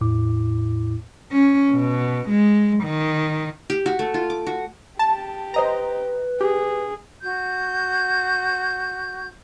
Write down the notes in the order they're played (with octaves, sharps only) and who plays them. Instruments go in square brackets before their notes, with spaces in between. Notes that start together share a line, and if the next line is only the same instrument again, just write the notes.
[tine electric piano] E2 A2 E4 D6
[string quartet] C#4
B2
G#3
D#3
[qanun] G4
F#4
A3
F4
D6
F#4
[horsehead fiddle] G4 [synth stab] A5
[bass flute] B4 [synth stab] C5 D#5 A#5
[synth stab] G4 [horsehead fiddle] G#4
[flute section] F#4 G6